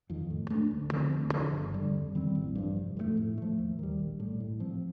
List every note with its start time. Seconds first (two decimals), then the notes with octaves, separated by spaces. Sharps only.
0.10 F2 D#3
0.30 A2
0.50 A3 D4
0.71 D2
0.92 D3 F3 C4
1.12 D2
1.33 D3 F3
1.53 G1
1.73 F2 D3 G3
1.94 F2
2.15 D#3 G3 C4
2.35 A1
2.55 G2 F3
2.76 F1
2.97 F2 D3 A3
3.17 A2
3.38 F3 A3
3.59 D#2
3.79 D#3 G3
3.99 A#1
4.20 A2 G3
4.40 A2
4.60 F3 C4